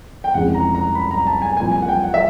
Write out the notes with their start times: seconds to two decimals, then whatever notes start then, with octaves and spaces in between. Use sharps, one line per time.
0.24 G5
0.34 F1 F2 C#3 E3 G#3 F#5
0.54 A#5
0.75 A#5
0.95 B5
1.11 A#5
1.27 A5
1.42 G#5
1.57 C2 A#2 F3 G#5
1.72 G#5
1.82 F#5
1.89 G5
2.04 F#5
2.14 E5